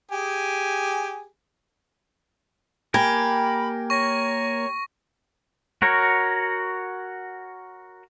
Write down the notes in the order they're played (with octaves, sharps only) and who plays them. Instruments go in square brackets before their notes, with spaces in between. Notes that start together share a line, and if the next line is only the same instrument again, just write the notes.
[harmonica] G4 G#4 G#5
[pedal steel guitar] A#3 A#4 G#5 [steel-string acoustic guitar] G4 [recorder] B5
[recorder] C#5 [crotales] C#6 A#6
[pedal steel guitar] F#4 A#4 C#5